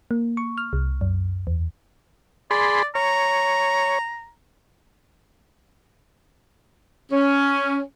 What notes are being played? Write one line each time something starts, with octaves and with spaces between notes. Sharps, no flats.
A#3
C#6
F6
C2
F#2
E2
G#4 D5 B5 C6
C#5 A#5
C#4